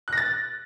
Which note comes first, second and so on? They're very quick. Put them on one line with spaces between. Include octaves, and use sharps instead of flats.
F#6 A#6 A6